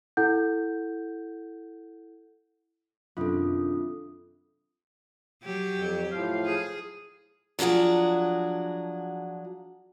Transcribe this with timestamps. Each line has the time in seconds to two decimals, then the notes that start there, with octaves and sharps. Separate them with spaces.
0.17 E4 A4 F#5 G6
3.17 F#2 C3 D#3 D4 F4 A4 D#6
5.43 F#3 G4
5.74 F2
6.11 A2 F3 F5
6.46 G#4
7.59 F3 F#3 D4 F#4 G#4